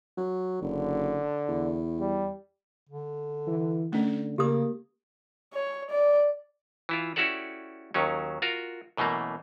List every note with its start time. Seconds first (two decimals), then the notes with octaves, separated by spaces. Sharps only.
0.18 F#3
0.62 F#1 D3
1.49 E2
1.99 G3
2.89 D3
3.47 E3
3.92 D3 A3 C#4
4.38 C#3 A#3 G4 D#6
5.53 C#5
5.90 D5
6.89 E3 E4 F4
7.16 C#4 E4 F#4 G4 A4 D5
7.94 D#2 D#3 F#3 C#4
8.42 F4 F#4 A#4
8.97 F#2 B2 E3 A3 A#3